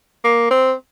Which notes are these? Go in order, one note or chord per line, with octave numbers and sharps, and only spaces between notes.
A#3
C4